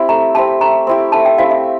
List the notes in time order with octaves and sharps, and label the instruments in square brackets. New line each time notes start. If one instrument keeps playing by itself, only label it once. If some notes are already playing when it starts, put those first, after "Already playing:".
Already playing: [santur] C4 E4 G4
[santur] A3 [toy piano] A#5
[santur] C4 E4 G4 [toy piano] A5
[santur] A3 [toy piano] A#5
[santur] C4 E4 G4
[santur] A3 [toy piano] A5
[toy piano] G5
[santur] C4 E4 G4 [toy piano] F5
[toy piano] E5